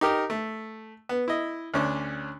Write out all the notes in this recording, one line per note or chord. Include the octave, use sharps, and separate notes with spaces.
D#4 G4 A#4
A3
B3
E4 D#5
D2 C#4 D4